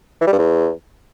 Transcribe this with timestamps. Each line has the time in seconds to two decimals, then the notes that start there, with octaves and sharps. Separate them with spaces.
0.21 E3
0.27 G3
0.33 G2
0.38 E2